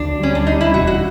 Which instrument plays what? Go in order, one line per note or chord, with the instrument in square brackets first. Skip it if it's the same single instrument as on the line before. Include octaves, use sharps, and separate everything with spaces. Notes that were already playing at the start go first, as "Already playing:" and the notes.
Already playing: [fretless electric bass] D2 [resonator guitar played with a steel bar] D4
[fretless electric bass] G3 [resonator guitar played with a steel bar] C#4
[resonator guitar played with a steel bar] D4
[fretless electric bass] G3 [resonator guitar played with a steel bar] D#4
[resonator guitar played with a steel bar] E4
[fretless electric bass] E1 [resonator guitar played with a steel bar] F#4
[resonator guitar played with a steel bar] F#4